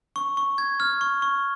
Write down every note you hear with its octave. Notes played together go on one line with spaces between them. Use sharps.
C#6
C#6
G#6
F6
C#6
C#6